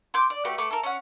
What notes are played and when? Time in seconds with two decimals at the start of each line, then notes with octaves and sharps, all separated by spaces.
0.14 C6 D6 G6
0.30 D5
0.45 A3 F#4 G4 B4
0.58 A3 B3 D6
0.71 A4 A#4
0.83 C#4 F#5